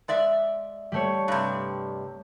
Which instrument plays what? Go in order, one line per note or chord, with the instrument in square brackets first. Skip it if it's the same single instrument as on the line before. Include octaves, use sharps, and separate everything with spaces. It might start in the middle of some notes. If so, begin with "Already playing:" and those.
[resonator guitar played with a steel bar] G#3 D5 E5
[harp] G3 A3 C#5
[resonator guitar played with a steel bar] G2 C3